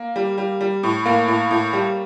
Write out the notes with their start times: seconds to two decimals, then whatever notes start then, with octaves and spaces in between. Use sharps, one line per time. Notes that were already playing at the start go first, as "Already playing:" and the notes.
Already playing: A#3
0.16 G3
0.38 G3
0.61 G3
0.83 A2
1.05 A2 A#3
1.28 A2
1.51 A2
1.73 G3